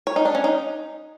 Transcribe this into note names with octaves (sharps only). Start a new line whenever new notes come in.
C#5
D#4
D4
C#4
D#4